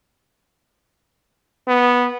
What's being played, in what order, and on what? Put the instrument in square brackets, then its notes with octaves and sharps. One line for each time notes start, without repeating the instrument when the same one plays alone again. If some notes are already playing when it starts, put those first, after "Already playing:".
[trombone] B3